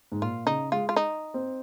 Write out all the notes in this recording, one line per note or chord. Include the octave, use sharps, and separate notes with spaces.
G#2
A#2 F4
C#3 D#4
G#3 F4
F4
D#4
C4